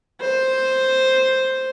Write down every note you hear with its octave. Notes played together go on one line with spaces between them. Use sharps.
C5